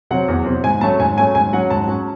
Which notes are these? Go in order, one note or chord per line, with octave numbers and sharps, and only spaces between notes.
C3 F#3 C4 F#5
E2
C3 F#3 C4
G#2 G#5
F#3 A3 C#4 A5
G#2 G#5
F#3 A3 C#4 G#5
G#2 G#5
F#3 C#4 F#5
G#2 A5
F#3 C#4